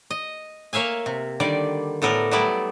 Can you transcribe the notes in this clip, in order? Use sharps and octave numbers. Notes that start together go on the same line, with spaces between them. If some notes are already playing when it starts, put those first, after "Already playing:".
D#5
A#3 C#5 E5 F5 G#5
C3
D3 D#3 G3 D5
A2 B3 A4 A#4 D5
F#3 G3 A3 B3 E4 D5